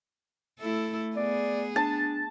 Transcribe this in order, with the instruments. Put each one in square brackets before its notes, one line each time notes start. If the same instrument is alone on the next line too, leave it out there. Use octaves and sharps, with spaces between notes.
[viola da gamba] A3 E4 A4
[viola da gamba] B3 G#4 [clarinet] D5
[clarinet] D4 [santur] A5